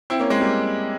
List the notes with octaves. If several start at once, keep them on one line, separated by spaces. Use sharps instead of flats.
C4 E4
A#3 C#4
G#3 C4
G3 A#3